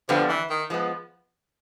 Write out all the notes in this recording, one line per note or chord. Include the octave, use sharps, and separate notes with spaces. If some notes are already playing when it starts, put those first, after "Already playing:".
F2 D3 F3 G3 B3
E3
D#3
F3 G#3 B3